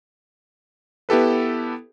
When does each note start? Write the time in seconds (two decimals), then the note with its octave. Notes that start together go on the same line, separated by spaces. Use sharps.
1.09 B3 E4 G4 A4 B4